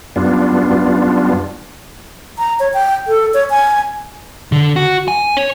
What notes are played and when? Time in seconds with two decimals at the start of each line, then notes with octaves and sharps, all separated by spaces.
0.16 F#2 G3 B3 D4 F4
2.38 A#5
2.60 C#5
2.74 G5
3.08 A4
3.34 C#5
3.50 G#5
4.52 D3
4.76 F#4
5.08 G#5
5.37 C#5